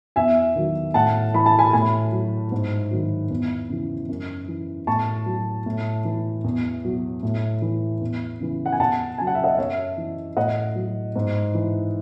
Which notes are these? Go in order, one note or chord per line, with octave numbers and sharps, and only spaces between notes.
E2 E5 G#5
D#3 F#3
A2 F#5 A5
E3 B5
A5
G#5 B5
A2 G#5 B5
F#3
G#2
D#3 F#3
E2
C#3 E3
F#2
E3
A2 A5 C#6
F#3
A2
E3
E2
B2 F#3
A2
E3
E2
C#3 E3
F#5
G#5
E2 F#5 A5
C#3 F#3 G#5
F#5
E5
D#5 F#5
F#2 C#5 E5
E3
A2 D#5 F#5
F#3
G#2
E3